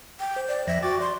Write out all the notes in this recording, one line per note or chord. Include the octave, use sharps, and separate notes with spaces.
G5
C5
D5
F2 F3 E5 A#6
F#4 G5 D6 A6
D5 C6